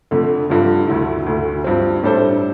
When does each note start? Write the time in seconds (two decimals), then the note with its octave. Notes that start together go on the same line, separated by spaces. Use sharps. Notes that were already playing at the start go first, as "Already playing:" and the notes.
0.11 F2 D3 A3
0.50 G2 D3 F3
0.87 D2 D3 A3 E4
1.26 D2 D3 A3
1.64 G2 F3 C4
2.03 A2 G3 D4 A4 C5